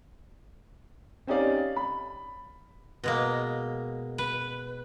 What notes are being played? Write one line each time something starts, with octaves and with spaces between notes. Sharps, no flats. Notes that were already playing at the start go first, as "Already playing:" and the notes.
C4 C#4 D#4 G4 D5 F5
B5
B2 G#3 A#3
B4